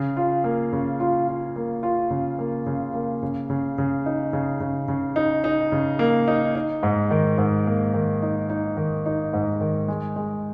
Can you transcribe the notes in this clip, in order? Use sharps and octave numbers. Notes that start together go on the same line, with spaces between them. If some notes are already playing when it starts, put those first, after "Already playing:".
Already playing: C#3
F4
A#3
C#3
F4
F4
A#3
F4
C#3
A#3
C#3
A#3
C#3
C#3
C#3
D#4
C#3
C#3
C#3
D#4
D#4
C#3
A#3
D#4
D#4
G#2
D#3
G#2
A#3
D#3
D#4
D#4
D#3
D#4
G#2
D#3
G#3
G#3